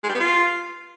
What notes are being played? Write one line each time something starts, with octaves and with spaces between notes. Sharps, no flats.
G#3
G3
B3
F4